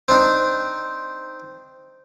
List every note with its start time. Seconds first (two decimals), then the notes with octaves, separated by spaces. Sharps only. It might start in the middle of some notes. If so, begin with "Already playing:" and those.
0.08 C4 D4 D#4